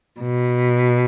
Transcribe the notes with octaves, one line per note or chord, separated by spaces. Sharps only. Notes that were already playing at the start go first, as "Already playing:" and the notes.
B2